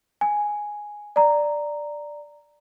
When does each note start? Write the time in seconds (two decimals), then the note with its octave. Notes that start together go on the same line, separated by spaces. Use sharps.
0.21 G#5
1.16 D5 A#5